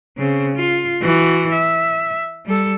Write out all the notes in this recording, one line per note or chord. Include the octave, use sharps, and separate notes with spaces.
C#3 C4
F4
E3 F#4
E5
G3 A4